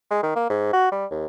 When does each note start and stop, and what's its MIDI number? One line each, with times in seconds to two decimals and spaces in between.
0.11 0.21 56
0.23 0.31 51
0.36 0.46 58
0.50 0.72 44
0.73 0.90 66
0.92 1.06 55
1.11 1.26 39